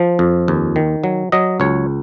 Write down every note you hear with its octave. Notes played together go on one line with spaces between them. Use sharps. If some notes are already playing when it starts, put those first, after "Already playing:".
Already playing: F3
F2
D#2
D#3
F#3
F#3 D#5
C#2 C#5